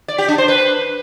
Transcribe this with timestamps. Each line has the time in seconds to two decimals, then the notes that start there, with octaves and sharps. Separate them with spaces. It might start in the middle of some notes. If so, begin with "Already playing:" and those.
0.08 D5
0.18 G4
0.28 D4
0.38 C5
0.48 B4